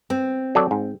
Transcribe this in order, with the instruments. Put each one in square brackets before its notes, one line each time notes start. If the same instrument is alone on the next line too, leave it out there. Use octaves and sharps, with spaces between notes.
[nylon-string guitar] C4
[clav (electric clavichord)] F#3 A4 D5
G#2